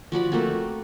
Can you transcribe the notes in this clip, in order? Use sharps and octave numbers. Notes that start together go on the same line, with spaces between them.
F3 F#4 D5 B5
A3 A#3 C4 F#4